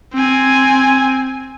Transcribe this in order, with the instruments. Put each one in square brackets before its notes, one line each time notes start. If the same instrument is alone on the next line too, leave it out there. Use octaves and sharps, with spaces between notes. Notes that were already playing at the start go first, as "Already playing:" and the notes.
[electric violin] C4 G#5